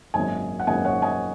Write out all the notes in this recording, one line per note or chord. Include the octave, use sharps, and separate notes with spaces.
G#1 F#2 C#3 A#3 D#5 G#5
F#5
G#1 F#2 C#3 A#3 D#5 G#5
C#5 F#5
D#5 G#5